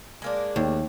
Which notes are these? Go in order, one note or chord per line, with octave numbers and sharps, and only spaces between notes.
G#3 A#3 D4
D#2